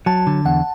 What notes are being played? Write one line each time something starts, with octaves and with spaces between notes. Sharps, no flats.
F#3 A5
D3
E2 F#5